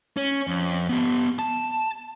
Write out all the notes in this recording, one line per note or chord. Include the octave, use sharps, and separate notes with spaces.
C#4
F2
B3 G4
A5